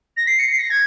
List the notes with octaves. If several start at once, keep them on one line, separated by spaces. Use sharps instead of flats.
A#6
C7
C#7
C7
A#6
G#6